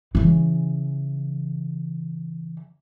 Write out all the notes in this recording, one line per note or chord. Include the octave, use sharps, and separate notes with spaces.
C#3 E3